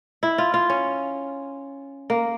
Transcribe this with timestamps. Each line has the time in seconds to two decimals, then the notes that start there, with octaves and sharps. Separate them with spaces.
0.23 E4
0.38 F4
0.54 F4
0.70 C#4
2.10 A#3